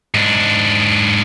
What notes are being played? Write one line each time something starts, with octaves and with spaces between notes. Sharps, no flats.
G#2 D4